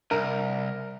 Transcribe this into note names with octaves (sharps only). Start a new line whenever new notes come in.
C2 A#4